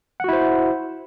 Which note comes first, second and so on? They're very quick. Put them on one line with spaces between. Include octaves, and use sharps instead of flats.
F#5 F#4 E4 C5